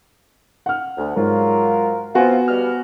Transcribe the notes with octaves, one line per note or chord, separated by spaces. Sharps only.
F#5 F6
D2
G#2 F#3 F4 A#4
B3 C4 F4 F#4 G#5
B2 G3 F6